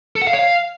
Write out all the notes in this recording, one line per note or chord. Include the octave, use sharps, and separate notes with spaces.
A4
F#5
F5
C#5
F5